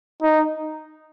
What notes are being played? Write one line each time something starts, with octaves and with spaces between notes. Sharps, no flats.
D#4